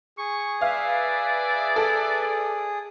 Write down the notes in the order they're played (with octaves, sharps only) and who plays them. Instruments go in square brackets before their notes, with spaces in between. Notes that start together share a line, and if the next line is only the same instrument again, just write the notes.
[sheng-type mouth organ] G#4 [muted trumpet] C#6
[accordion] B4 E5 [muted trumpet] D5 [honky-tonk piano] F5
[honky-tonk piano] A4